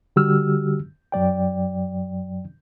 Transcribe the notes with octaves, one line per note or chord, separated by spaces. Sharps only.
D3 G3 F#4 G4 E6 F6
F#2 F#3 D5 G5